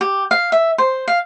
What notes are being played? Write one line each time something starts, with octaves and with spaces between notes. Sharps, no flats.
G4
F5
E5
C5
F5